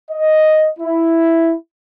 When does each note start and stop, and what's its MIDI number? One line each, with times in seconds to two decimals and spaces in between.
0.11 0.70 75
0.79 1.55 64